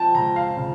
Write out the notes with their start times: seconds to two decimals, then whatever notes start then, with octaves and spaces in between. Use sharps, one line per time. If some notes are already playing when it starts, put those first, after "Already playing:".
Already playing: F3 G5 A5
0.14 C#2 A#5
0.36 F5
0.57 C#3